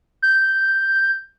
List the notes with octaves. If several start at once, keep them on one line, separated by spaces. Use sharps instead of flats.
G6